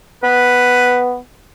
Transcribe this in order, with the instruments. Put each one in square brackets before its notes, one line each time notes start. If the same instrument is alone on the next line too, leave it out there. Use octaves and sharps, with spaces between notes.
[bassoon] B3 [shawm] B4